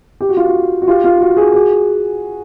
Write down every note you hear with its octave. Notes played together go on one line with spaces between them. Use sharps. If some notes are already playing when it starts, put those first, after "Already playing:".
G4
F#4
F4
F#4
F#4
F4 G4
F4
F#4
F#4 G#4
F#4 G#4